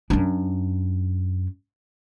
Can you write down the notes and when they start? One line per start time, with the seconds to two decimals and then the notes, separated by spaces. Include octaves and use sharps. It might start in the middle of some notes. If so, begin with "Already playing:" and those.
0.10 F#2 D4